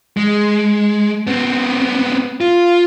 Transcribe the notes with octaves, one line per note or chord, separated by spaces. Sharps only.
G#3
B3 C4
F4